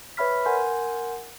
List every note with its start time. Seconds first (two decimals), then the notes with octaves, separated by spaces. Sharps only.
0.17 B4 C#5 E5 B5 F6 B6
0.46 A#4 F#5 G#5 C6 G6